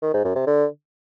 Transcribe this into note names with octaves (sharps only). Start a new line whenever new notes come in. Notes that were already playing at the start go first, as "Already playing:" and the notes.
D#3
G#2
F#2
C3
D3